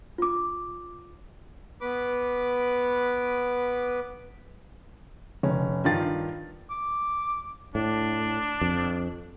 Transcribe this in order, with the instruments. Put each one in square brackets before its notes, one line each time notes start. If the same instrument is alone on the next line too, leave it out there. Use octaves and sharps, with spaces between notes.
[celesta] F4 D6
[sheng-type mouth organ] B3 B4 B5 D6
[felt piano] F1 C#4
G2 D#3 F4 A6
[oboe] D6
[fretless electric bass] A2 [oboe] D4
[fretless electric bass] F2